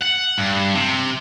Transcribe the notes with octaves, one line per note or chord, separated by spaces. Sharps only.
F#5
G2
C3